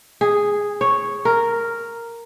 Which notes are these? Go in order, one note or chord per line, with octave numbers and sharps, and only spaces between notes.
G#4
C#5
A#4